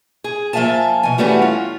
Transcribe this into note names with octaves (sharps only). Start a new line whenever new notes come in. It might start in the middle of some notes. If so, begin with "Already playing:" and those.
G#4
F3 A#3 E5 F5 G#5 A5
B2 G#5
E3 G3 A3 B3 C#4 F#4
F4